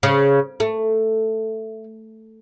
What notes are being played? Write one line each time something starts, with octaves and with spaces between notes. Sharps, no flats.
C#3
A3